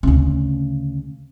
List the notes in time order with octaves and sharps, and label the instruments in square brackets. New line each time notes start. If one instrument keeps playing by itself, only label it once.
[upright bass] D2 C#3